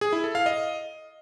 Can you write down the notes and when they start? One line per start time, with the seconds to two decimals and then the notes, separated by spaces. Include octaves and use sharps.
0.01 G#4
0.13 E4
0.24 A4
0.35 F5
0.46 D#5